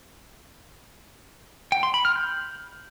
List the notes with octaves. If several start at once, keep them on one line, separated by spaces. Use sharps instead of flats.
G5
C6
B5
F6
G6